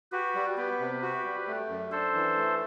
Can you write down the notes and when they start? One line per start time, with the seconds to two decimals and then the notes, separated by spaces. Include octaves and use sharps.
0.12 F#4 G4 B4
0.35 G3
0.57 B3 G4 B4
0.80 C3
1.02 F#4
1.25 G3
1.47 A3
1.69 F#2
1.91 D4 A4 C5
2.14 E3
2.36 A3